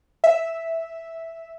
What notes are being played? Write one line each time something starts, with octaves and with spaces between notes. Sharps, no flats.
E5